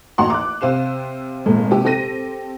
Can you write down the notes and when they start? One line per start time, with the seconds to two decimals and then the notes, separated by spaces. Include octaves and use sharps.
0.18 A1 D#2 F#4 F#5 A#5 C6
0.30 D6 F#6
0.61 C3 C5 F5 E7
1.46 G#1 A#2 A3
1.71 C3 G4
1.84 C4 G4 A4 A#6 D#7